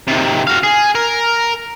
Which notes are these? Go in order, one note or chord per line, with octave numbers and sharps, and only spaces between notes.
C3 D#3
F#4 F5
G#4
A#4